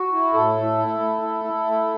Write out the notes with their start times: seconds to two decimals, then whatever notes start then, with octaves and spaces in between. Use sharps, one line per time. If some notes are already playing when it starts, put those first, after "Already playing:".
Already playing: F#4
0.12 E4
0.33 A2 A4
0.56 A3
0.78 E4
1.00 A3
1.22 E4
1.44 E4
1.66 A3